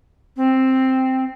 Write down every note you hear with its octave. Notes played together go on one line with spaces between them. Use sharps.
C4